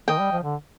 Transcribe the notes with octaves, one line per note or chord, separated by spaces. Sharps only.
D#3 D#5 G5
G3
F3
D3